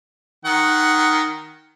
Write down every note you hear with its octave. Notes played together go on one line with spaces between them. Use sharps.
D#3 F#5